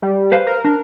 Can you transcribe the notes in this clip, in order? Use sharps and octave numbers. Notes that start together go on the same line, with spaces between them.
G3
B4 C5 F5
A#4
D4 A#4